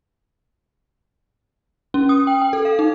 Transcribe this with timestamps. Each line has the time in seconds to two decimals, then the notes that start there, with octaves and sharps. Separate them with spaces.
1.94 C#4
2.09 D#6
2.27 G5
2.42 G5
2.53 A4
2.65 F5
2.79 D#4